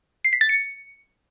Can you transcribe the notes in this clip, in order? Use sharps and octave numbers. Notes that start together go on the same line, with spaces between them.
C7
B6
A6
C#7